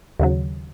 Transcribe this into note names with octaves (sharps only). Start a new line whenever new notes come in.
D#2 C#3 F#3